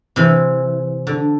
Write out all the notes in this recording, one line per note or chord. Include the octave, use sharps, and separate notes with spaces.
C3 E3
D3